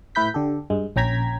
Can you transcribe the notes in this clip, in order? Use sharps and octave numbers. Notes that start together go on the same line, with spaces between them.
A2 E4 B4 G6 B6
D3 G4 A4
G2 G#3
A#1 C#4 G5 A#5 G#6 B6